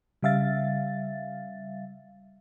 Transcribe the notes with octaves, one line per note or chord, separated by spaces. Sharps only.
C#3 G3 E5 F5 A6